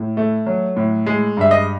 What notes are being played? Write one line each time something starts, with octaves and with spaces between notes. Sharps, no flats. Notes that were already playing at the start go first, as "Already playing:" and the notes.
Already playing: A2
A3
F#3
A2
G#3
G2 E5
D#5